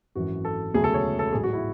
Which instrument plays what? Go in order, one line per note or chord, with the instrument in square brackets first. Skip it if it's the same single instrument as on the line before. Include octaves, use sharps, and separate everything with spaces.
[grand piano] G#1 F#2 E3 F#4
A4
E1 D2 C#3 F#3 A3 G#4
A4
C#5
A4
A1 G#2 F#3 G#4
F#4
E4